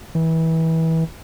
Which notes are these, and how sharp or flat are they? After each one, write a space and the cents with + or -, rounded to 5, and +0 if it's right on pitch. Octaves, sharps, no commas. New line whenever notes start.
E3 -25